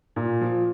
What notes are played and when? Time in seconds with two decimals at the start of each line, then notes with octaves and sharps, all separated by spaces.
0.16 A#2
0.41 F3